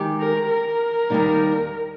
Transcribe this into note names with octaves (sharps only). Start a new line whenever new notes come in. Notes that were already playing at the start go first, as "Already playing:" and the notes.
Already playing: D#3 G#3 D#4 G4
A#4
A#4
D#2 D#3 G3 A#3 D#4